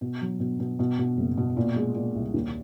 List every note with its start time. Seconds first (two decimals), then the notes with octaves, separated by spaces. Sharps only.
0.01 B2
0.21 F#3
0.40 B2
0.60 B2
0.79 B2
0.99 B2
1.17 F#1
1.37 B2
1.57 A#2
1.76 G#3
1.95 A#2
2.15 C2
2.34 D#2